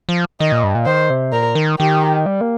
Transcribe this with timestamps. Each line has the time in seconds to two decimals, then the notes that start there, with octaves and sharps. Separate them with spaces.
0.09 F3
0.40 D#3 D#5
0.52 A#2
0.64 G2
0.75 A#2
0.86 D#3 C5
1.10 C3
1.32 A#2 A#4
1.55 D#3
1.79 D#3 G4
2.26 G3
2.41 A#3